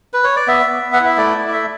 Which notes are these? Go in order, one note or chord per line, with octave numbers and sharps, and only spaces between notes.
B4
C#5
D5
B3 E5
B3
B3
F#5
E4
E5
A3 D5
E4
D5
A3 E5